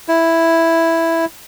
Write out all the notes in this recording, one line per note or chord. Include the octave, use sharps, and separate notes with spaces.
E4